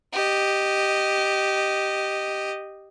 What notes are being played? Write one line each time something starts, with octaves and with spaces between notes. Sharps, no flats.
G4 D#5